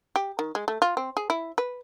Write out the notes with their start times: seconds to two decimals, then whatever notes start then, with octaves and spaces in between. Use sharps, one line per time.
0.16 G4
0.39 D#3
0.55 G#3
0.68 A3
0.82 F4
0.97 C4
1.17 G#4
1.30 E4
1.58 B4